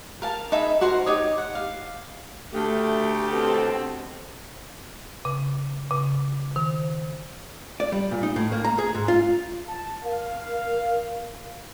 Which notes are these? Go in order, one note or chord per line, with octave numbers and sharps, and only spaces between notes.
A#4 F5 A5
D#4 G#4 E5 B5
F#4 A#4 C5 A#5
D#4 G4 C#5 D#6
F#5
F5
D2 A3 G4
B2 C4 A4
C#3
C#3
D#3
D5
G3
A#2
D#4
A2
A#3
A#5
G#4
G#2
F4
A5
A#4 F5